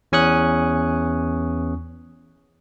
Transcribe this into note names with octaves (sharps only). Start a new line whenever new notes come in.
E2 C#4 G#5 C#6 D#6 F#6